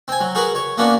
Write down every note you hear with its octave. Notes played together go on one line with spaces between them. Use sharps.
C4 G#5
F#3
F#4 G#4 A#4 B4
C#5
A#3 B3 C#4 D4 F#4